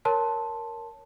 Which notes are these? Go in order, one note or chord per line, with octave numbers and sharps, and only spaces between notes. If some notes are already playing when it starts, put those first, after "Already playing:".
A#4 C#5 A5 C6